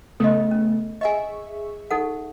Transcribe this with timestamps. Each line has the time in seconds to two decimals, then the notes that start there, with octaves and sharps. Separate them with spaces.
0.20 C#3 A3 B3 A4 D#5
0.51 C#4
1.01 G#4 D#5 E5 G#5 C#6
1.91 D#4 A4 F#5